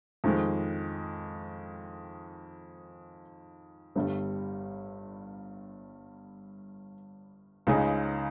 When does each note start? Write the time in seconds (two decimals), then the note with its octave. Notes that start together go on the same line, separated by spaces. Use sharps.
0.24 F2 D#3 G#3
3.96 G1 G2 G3
7.67 C#2 C#3 G#3 D#4 G#4